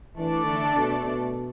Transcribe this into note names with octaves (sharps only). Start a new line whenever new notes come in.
E3 A3 D4 A4 D5
D3
B2
B2